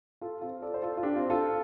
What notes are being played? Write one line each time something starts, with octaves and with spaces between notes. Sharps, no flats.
F4 A4
C4 F4
A4 D5
C5
F4 A4
F4
D4 G4
C4 F4
F4 A4